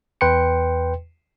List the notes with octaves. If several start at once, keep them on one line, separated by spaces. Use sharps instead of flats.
E2 B4 G5 C6 C#7